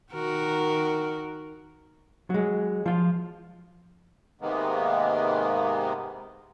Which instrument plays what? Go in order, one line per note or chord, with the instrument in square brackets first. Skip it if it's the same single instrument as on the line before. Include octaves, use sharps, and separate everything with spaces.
[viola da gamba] D#3 F#4 A#4
[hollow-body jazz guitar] F#3 G#3
F3 F4
[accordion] G#2 C3 D#3 G#3 A#3 B3